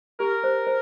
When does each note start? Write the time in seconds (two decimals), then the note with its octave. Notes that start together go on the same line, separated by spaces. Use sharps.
0.20 G4 A#4
0.44 C5
0.67 C5